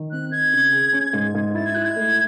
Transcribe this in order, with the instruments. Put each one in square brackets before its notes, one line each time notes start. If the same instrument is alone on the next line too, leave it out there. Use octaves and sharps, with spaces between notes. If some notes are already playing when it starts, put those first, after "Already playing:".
Already playing: [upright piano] D#3
[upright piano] C4 [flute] F#6
[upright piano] D#4 [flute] G#6
[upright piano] C#3
G#4
C#4
G#2
G#2
[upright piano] E4 [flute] A6
[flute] G#6
[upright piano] E4 [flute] F#6
[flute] G#6
[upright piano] A3